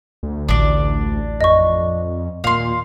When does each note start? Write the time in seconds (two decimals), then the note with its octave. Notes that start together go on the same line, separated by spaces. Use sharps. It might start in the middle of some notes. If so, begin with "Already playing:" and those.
0.23 D2
0.49 A1 D4 D5
1.41 F2 D#5 C#6
2.44 D#2 A#2 F5 C6